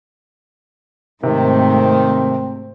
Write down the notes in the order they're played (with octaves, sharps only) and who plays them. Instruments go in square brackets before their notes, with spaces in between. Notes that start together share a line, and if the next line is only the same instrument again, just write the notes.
[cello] G#2 A3 [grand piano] C3 [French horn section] D#3 [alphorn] C4